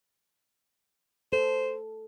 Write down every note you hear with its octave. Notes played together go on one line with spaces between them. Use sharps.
A4 C5